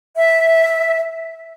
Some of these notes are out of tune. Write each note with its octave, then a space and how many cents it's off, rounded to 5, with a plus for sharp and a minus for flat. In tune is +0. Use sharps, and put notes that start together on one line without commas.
E5 -10